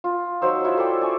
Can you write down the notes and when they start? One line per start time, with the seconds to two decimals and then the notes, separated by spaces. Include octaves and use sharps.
0.04 F4
0.42 F#3 D#4 C5 E6
0.65 E4 F4 E5 F#5
0.77 A4 C5 D5 G5
1.01 D5 G#5 C#6